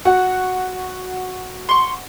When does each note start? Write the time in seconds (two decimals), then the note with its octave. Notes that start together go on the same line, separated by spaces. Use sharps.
0.05 F#4 F#5
1.69 C6 C#6